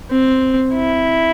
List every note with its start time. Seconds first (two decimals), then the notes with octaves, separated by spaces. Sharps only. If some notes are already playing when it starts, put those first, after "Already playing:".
0.11 C4
0.75 E4